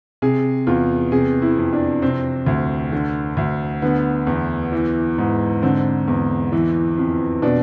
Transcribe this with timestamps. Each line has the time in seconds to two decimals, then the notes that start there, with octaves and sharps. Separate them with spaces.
0.22 C3 G#4
0.67 E2 F4
1.12 C3 G#4
1.42 E4
1.57 F2
1.73 D4
2.02 C3 C4
2.47 D2
2.92 D3
3.37 D2
3.82 D3 B3
4.27 E2
4.72 E3
5.18 G#2
5.62 D3 C4
6.08 E2
6.52 E3
6.97 F2
7.42 B2 D4